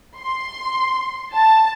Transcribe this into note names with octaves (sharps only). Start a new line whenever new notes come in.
C6
A5